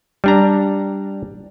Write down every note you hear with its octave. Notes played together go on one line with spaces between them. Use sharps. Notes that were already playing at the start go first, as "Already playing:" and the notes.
G3 D4 A#5